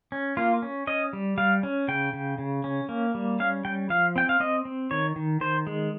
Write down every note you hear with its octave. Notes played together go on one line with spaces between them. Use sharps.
C#4
A#3 F4
C#4
C#4 D#5
G3
G3 F5
C#4
C#3 G5
C#3
C#3
C#4
A#3
G3
C#4 F5
G3 G5
F3 F5
C4 G5
F5
C4 D#5
C4
D#3 C#5
D#3
D#3 C5
G#3